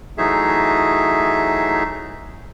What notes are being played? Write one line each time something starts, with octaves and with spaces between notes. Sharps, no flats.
E3 F#3 A3 D#4 G#4 E5